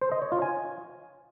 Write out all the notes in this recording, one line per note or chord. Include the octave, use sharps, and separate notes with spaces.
C5
D#5
C#5
F4
G#5